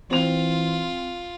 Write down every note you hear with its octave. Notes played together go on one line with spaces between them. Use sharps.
E3 C4 F4 F7